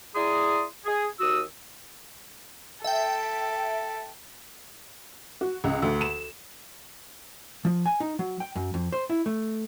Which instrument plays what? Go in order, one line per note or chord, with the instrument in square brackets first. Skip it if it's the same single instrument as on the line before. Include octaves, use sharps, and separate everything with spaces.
[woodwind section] E4 G#4 D5 A#5 C6 D#6
G#4
D#2 F#4 D#6 E6
[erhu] A4 [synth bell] E5 G5
[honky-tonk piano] F#4
C#2
D2
E7
[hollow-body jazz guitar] F3
G#5
D#4
F#3
G5
F#2
F2
C5
E4
A3